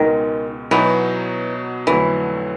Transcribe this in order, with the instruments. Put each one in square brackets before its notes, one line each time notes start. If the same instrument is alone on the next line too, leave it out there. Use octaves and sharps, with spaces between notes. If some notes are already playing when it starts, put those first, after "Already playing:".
Already playing: [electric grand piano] C#2 B2 G#3 B3 [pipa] D#3
[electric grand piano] B2 F#3 B3 D#4 F#4 [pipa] E3
[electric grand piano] F2 D3 F#3 A3 [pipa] E3